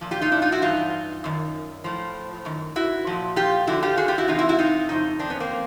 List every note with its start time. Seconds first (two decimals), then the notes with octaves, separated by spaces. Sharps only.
0.01 A#2 F3
0.11 F4 G4
0.21 D#4 F4
0.32 D4 E4
0.42 D#4 F4
0.52 E4 F#4
0.62 G2 E3 D#4 F4
1.24 F#2 D#3
1.84 A2 F3
2.45 F#2 D#3
2.76 E4 F#4
3.07 A#2 F3
3.36 F4 G4
3.67 F#2 D3 F3 E4 F#4
3.83 F4 G4
3.97 F#4 G#4
4.08 F4 G4
4.18 E4 F#4
4.28 F2 C3 E3 D#4 F4
4.39 E4 F#4
4.49 E4 F#4
4.59 D#4 F4
4.89 F2 C#3 D#4
5.19 C4 D4
5.30 B3 C#4
5.40 A#3 C4
5.50 F3